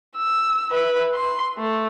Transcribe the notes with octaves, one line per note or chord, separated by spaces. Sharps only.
E6
B4 E5
C6
A3